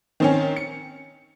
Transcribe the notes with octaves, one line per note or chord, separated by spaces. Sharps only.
D#3 C4 C#4
C#7